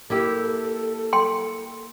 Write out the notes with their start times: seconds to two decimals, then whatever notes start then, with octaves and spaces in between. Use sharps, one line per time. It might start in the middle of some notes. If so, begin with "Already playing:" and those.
0.10 A#3 E4 G4 A4
1.13 G5 C6